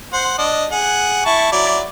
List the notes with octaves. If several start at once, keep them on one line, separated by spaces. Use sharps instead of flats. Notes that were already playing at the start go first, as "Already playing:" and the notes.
C5 F#5
D4 D#5
G#4 F#5
E4 A5 C#6
F#3 E4 D5